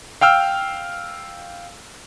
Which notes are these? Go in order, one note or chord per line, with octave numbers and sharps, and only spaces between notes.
F5 G5 E6 F6